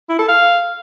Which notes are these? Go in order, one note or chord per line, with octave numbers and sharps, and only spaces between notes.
E4
A4
F5